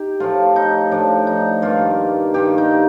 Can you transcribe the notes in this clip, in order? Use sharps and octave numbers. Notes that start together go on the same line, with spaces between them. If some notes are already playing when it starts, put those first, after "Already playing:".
Already playing: D#4 G4
A2 F3 A3 F4
D#4
A2 F3 A3 D4
D#4
G2 D#3 A#3 F4
G2 D#3 A#3 G4
D#4